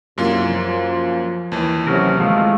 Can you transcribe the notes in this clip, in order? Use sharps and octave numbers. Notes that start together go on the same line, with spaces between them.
C2 F#2 A#3 F4
F3
D#2 E3
C3 F#3 C#4 A#4
F3 G#3 A3 F4